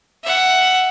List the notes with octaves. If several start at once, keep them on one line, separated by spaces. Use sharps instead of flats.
E5 F#5